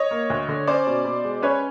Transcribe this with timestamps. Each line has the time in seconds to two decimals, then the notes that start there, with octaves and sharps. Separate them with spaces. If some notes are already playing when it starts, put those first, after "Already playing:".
Already playing: C#5 D#5
0.11 A#3
0.30 D2
0.49 D3
0.67 C#4 C5 D5
0.87 B2
1.05 B2
1.24 G#3
1.42 C#4 B4 C#5